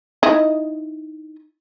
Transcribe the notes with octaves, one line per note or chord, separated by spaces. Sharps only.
D#4 E4 D#5